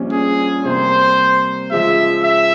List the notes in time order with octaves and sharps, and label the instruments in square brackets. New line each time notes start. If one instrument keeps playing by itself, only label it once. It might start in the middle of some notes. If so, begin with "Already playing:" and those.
Already playing: [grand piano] A#1 A#2 G3 C#4
[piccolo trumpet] G#4
[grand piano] C3 G3 A#3 [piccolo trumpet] C5
[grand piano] C#3 F3 G#3 [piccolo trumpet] E5
[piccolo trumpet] E5